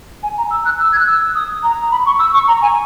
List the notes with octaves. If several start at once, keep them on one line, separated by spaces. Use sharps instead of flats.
G#5
A#5
E6
F#6
E6
G#6
F#6
E6
D#6
A#5
B5
C#6
E6
C#6
A#5
G#5